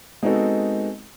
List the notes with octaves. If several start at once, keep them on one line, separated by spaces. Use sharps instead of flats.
G#3 B3 C4 D#4 F#4 A4